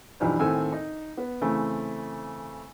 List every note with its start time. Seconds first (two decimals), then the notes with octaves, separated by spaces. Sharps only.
0.20 B1 E2 G2 E3 F3 G3
0.39 D#2 A2 C4 A4 G#5 E6
0.72 D#4
1.18 B3
1.41 C#3 E3 A3 C4